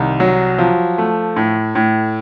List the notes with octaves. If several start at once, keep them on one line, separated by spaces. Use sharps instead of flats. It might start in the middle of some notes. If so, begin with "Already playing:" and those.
Already playing: C2 D#3
F#3
F3
A3
A2
A2